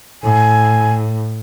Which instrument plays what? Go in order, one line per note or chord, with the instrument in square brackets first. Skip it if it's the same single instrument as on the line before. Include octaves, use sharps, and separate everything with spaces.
[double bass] A2 [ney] G#5